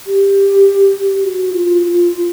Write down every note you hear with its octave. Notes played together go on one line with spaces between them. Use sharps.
G4
F#4
F4
F4
F4